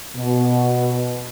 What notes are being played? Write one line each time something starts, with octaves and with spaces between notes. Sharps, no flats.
B2